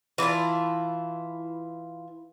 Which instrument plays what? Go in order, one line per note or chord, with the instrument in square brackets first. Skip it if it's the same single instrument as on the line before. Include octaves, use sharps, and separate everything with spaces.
[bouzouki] E3 E4 F4 A5